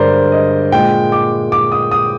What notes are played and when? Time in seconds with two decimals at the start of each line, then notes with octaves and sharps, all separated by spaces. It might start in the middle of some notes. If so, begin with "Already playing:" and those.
Already playing: G2 D3 G#3 A#4 C5 D5
0.32 D#5
0.72 A#2 G#3 G5
1.12 D6
1.52 D6
1.72 D#6
1.91 D#6